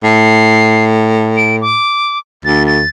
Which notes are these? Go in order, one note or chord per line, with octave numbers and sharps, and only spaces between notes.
A2 C7
D7
D6
D2 A6
A6